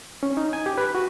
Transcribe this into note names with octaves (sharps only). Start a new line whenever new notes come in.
C#4
D#4
G#5
G4
B4
F#4